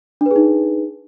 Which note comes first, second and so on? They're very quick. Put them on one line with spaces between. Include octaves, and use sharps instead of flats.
D4 B4 G#4 D#4